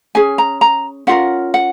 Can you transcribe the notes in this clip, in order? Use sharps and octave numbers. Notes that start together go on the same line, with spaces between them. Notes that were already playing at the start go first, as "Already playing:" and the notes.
C#4 G#4 G#5
A#5
A#5
C#4 F4 A#4 F#5
F#5